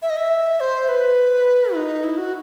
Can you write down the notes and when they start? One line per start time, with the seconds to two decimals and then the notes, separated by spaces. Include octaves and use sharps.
0.02 E5
0.10 D#5
0.17 E5
0.60 C5
0.88 B4
1.75 D#4
2.04 E4
2.18 F#4